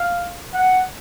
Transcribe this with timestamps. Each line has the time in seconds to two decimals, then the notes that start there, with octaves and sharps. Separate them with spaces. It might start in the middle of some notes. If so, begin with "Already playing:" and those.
Already playing: F5
0.54 F#5